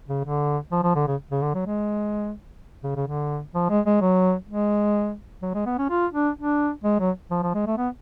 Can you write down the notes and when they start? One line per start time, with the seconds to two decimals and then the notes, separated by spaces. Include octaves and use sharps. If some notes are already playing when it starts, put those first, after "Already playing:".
0.09 C#3
0.25 D3
0.72 F3
0.83 F3
0.95 D3
1.07 C#3
1.31 C#3
1.42 D3
1.54 F#3
1.66 G#3
2.83 C#3
2.95 C#3
3.07 D3
3.54 F3
3.70 G#3
3.86 G#3
4.01 F#3
4.48 G#3
5.42 F#3
5.54 G#3
5.66 B3
5.78 C#4
5.90 F4
6.13 D4
6.37 D4
6.84 G#3
7.00 F#3
7.31 F3
7.43 F3
7.54 G#3
7.67 A3
7.78 B3